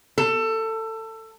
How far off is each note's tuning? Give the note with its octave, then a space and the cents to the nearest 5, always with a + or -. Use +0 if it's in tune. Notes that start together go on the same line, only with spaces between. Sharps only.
A4 +20